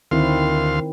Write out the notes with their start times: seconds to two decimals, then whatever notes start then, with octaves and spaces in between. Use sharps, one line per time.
0.11 D2 D#3 C4 E4 F5 C6